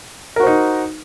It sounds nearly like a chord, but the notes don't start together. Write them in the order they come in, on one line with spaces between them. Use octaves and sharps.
A#4 F#4 C5 D#4